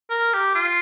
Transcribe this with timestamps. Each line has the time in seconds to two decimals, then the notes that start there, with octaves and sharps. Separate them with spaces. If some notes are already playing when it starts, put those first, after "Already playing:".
0.10 A#4
0.34 G4
0.55 F4